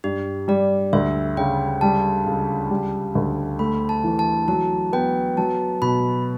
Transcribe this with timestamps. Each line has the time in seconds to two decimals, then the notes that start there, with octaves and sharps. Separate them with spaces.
0.04 G2 G4
0.48 G3 D5
0.93 D2 E5
1.37 C#3 G5
1.81 G3 A5
2.26 C#2
2.71 G3
3.15 D2
3.59 A3 B5
3.89 A5
4.04 E3
4.19 A5
4.48 F#3 A5
4.93 B3 G5
5.37 F#3 A5
5.82 B2 B5